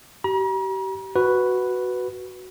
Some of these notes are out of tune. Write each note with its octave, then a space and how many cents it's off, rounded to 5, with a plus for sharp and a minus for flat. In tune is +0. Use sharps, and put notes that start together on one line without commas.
G4 -35 A#5 +40
F#4 +0 B4 +0